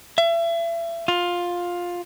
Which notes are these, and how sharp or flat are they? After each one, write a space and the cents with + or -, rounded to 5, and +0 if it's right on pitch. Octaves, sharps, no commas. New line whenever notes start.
E5 +35
F4 +10